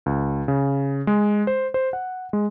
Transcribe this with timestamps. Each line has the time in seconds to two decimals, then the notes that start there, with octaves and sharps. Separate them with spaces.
0.06 C#2
0.48 C#3
1.07 G#3
1.47 C5
1.74 C5
1.93 F#5
2.33 G#3